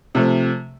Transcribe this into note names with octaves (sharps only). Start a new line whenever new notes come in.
C3 F3 A3